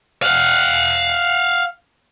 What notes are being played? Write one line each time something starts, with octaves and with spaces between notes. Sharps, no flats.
F5 F#5